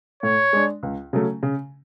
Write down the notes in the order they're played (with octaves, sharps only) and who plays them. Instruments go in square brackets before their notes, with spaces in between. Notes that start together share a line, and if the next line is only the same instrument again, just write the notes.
[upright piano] A2 [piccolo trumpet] C#5
[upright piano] G#3 D4
C#2
C#3 F#3 A3 C#4
C#3